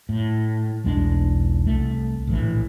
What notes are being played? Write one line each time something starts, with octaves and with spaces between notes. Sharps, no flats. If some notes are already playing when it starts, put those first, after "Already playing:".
A2
B1 E2 G#3 D4
C2 A3
A#1 A2 E3